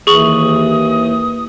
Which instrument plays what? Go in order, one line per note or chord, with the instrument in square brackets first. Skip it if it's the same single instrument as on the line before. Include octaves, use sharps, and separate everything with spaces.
[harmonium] D#2 E3 [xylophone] G#4 C#6 F#7 [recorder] D#6